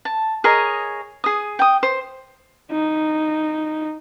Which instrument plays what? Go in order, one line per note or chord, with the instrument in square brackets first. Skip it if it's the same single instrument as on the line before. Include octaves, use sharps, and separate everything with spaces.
[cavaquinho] A5
G#4 A#4 C#5 D#5
G#4 D#6
G5 D#6
C5
[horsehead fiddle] D#4